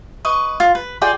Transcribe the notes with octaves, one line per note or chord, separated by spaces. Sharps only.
B4 D#5 C#6
F4
B4
F4 G#4 D5 G5